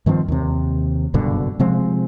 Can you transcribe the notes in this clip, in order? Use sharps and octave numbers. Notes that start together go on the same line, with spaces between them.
G2 D#3 F3 C4
D#2 C3
F#1 G2 B2 D3
C3 F3 G#3 C4